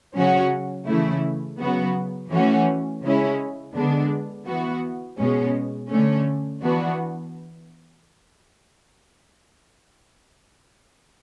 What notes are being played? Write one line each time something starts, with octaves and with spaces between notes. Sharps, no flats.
C#3 F#3 C#4 F#4
C#3 E3 A3 E4
C#3 F#3 B3 F#4
E3 A3 C#4 F#4
C#3 G#3 C#4 E4
D3 G#3 B3 D4
E3 B3 F#4
B2 G#3 C#4
D3 A3 C#4
E3 B3 D4 F#4